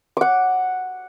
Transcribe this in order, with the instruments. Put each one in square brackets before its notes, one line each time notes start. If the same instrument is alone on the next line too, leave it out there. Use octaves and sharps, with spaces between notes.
[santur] F#5 D6